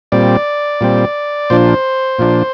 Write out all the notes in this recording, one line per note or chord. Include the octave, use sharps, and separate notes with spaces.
A#2 G3 C4 D5
A#2 G3 C4
A#2 F3 D4 C5
A#2 F3 D4